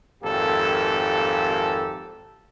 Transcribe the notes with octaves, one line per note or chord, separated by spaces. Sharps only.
G#1 F2 A#3 G4 A4